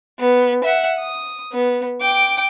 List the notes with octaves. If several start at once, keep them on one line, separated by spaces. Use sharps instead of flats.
B3
E5 F#5
D#6
B3
G5 D6